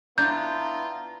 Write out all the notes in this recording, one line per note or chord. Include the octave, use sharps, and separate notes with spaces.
B3 D4 E4 F4 A#5 G6